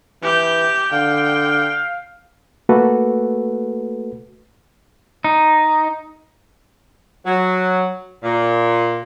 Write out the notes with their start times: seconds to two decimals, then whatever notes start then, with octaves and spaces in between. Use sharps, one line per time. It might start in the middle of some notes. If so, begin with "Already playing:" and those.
0.23 E3 G4 G6
0.92 D3 F5 G5
2.69 A3 A#3 F#4 A4 B4
5.24 D#4
7.25 F#3
8.23 A#2